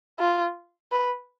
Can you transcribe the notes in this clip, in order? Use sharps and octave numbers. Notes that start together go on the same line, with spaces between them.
F4
B4